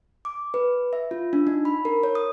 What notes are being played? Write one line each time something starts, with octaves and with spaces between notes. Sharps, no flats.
D6
B4
E5
F4
D4
D#4
B5
A#4
C#5
D#6